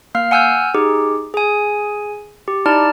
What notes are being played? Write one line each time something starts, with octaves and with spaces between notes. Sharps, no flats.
A#3 F5 F6
F#5 G#5 E6 F6 G6
D#4 G4 G#4
G#4 G#5
G4
D#4 E4 D5 A5 F6